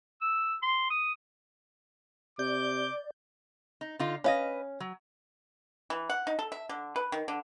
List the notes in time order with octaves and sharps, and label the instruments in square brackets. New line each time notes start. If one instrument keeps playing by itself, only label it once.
[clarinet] E6
C6
D#6
[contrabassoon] C3 [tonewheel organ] D5 [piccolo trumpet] D6 [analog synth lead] G6
[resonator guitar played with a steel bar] D#4
D3 D#4 F4
[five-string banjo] C#4 F5 [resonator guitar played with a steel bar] B4 D#5
[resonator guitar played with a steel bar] F#3
[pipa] E3
F#5
D#4
A4
E5
D3
B4
D#3
D3